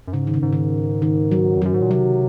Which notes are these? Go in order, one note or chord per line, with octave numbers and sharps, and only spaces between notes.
F#2
G#2 C#3
D#3
C#3
G#2
D#3
D#3
F#3
F2
F#2 F#3
G#2
A#2
C3 F#3